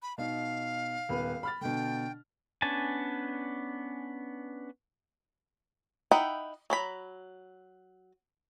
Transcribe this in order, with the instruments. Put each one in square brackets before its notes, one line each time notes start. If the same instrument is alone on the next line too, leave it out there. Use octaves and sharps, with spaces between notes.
[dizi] B5
[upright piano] B2 D#4 [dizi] F5
[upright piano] D#1 B3 B4
B5 F6 A6
[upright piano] B2 D3 [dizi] G5
[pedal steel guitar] B3 C#4 D4 G#5 A5
[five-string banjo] D#4 E4 F#5 G5 B5
F#3 A#5 B5